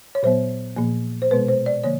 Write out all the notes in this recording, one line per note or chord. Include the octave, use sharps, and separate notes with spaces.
C#5
A#2 F#3 B3 C5
A#2 F3 A#3
C5
B2 G#3 B3 B4
C5
D5
D3 F3 A#3 C#5